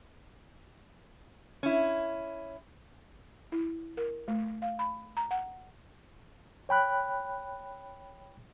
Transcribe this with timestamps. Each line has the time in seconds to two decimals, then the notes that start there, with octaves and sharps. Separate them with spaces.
1.63 C#4 E4
3.52 E4
3.97 A#4
4.28 A3
4.62 F5
4.79 B5
5.17 A#5
5.31 F#5
6.69 C#5 G5 B5 F#6